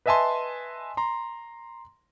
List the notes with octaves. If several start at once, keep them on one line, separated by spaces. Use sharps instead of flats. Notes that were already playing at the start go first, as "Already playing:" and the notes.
B4 D#5 E5 G#5 A5 C6
A#5 C6